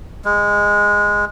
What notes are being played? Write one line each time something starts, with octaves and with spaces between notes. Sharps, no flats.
G#3